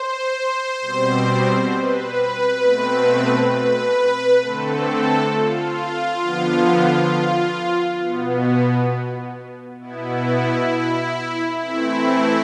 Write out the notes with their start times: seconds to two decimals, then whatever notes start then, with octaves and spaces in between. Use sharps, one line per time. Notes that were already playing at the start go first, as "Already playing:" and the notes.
Already playing: C5
0.81 B2 G3 C4
1.70 B4
2.61 B2 A3 C4
3.50 B4
4.40 D3 A3 C4 A4
5.30 F4
6.20 D3 F3 B3
8.00 B2 B3
9.79 B2 B3 E4
11.59 E3 A3 C4 E4